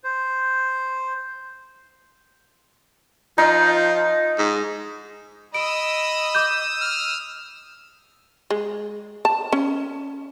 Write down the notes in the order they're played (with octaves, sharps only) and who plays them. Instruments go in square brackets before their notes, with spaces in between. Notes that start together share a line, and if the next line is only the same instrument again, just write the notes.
[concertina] C5
[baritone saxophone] F3 [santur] D#4
[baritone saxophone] G#2
[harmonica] D#5 B5 [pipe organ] D#6 E6 [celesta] D7
[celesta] D6 G6
[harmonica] F6
[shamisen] G#3
A5
C#4